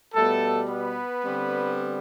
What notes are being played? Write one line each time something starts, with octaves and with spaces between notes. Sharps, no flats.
B2 G3 A3 B3 A4
B3 B4
D3 G3 C4